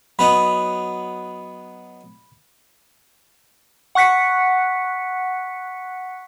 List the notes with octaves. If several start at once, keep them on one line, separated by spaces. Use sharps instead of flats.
F#3 B3 D#4 B5
F#5 C#6 F#6 B6 C#7